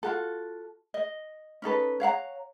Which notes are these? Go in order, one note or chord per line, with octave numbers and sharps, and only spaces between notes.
F4 F#4 A4
D#5
C#4 D#4 A4 B4
C#5 F5 F#5 A#5